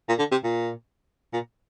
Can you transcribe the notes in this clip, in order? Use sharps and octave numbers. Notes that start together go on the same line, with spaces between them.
A#2
D3
C3
A#2
A#2